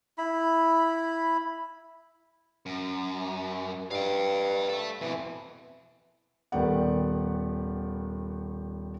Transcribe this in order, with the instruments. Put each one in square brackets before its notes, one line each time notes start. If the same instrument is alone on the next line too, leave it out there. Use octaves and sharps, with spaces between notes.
[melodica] E4 B5
[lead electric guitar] F#2
[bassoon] G2 [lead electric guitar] F5 G5
[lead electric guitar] A4 E5
[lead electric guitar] F2 B2 [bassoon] E3
[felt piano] D#1 D#3 B3 G4 D5 F#5